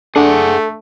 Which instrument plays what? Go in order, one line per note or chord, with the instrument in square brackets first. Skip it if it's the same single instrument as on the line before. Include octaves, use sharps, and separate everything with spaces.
[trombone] A3 [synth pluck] D4 [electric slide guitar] G#4 F#5 [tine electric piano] A4